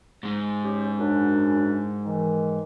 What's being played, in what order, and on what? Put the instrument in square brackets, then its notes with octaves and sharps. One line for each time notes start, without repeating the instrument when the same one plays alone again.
[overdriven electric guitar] G#2 G#3
[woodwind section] C#4 G4
F#2 D4
D#3 E3